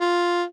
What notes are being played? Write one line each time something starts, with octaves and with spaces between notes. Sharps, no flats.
F4